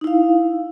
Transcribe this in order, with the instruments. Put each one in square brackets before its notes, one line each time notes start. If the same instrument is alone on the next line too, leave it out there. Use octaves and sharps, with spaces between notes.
[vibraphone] D#4
E4
F5